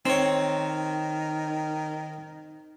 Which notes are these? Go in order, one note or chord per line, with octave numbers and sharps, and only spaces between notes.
D#3 C4 C#5